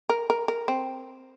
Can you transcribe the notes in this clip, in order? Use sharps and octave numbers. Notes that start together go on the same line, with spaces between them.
A#4
A#4
A#4
C4